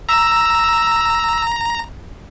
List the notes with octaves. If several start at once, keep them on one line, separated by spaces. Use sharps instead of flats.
A#5 E6